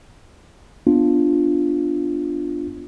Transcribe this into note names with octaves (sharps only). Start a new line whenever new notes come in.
B3 D4 F4